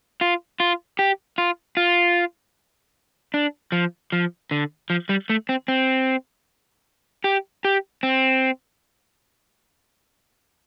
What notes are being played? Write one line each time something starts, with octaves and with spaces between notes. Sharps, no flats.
F4
F4
G4
F4
F4
D4
F3
F3
D3
F3
G3
A3
C4
C4
G4
G4
C4